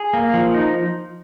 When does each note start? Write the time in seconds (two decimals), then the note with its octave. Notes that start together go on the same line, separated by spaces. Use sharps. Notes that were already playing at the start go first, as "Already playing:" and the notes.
Already playing: G#4
0.13 A#3
0.34 F3
0.54 D#4